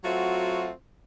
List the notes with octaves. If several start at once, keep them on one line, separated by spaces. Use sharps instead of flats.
F#3 A3 C4 F4 F#4